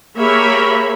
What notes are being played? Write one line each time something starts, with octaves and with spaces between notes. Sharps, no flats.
A#3 G4 G#4 C#5 E5 B5